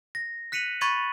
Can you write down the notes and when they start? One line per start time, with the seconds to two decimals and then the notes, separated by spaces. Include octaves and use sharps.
0.15 A#6
0.52 F#6 B6 C#7 D#7 F7 F#7
0.81 B5 C#6 G#6 A6 D#7 F#7